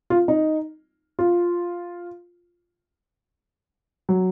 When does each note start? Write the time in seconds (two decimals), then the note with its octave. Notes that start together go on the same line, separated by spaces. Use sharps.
0.10 F4
0.28 D#4
1.19 F4
4.09 F#3